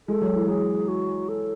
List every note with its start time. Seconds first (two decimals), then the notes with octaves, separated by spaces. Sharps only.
0.08 G#3 A4
0.21 F#3
0.35 E3
0.48 F#3 G#4
0.88 F#4
1.29 A4